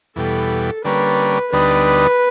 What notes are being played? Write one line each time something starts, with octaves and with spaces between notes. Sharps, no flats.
E2 B2 G3 A4
D3 G3 A#3 C#4 B4
D2 D3 G3 B3 D#4 B4